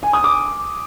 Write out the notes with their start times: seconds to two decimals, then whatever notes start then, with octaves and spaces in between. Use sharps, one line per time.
0.03 G#5
0.13 D#6
0.24 D6